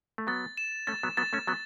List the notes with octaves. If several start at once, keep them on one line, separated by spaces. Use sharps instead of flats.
A3
F#3 B3 A6
E7
A3 C#4 A6
F#3 B3
F#3 B3 A6
A3 C#4
F#3 B3 A6